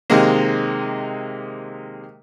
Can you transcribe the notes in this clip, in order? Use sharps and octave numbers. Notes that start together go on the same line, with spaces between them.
C3 D#3 G#3 A#3